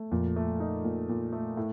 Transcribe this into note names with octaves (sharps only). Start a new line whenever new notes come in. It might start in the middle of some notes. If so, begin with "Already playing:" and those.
Already playing: A3
F2 A#2
A3
D#4
A#2
A#2
A3
A2